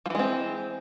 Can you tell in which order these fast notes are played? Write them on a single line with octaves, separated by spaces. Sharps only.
F3 E3 G#3 C4